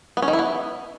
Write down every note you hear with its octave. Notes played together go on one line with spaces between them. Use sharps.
B3
C#4
D#3
E4
B3